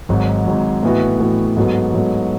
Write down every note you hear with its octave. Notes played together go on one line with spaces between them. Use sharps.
G#1 G#2 F#3
G#1 G#2 F#3
A2 E3 B3 F#4
A2 E3 B3 F#4
G#2 F#3 B3 F#4 A4
G#2 F#3 B3 F#4 A4